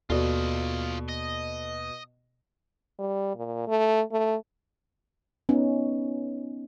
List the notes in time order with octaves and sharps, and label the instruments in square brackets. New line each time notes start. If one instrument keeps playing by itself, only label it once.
[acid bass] D#2 [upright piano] B2 [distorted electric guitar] F4 D#5 [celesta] F#4 A4 D5
[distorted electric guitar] D#5
[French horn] G3
A#2
A3
A3
[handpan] B3 C#4 D#4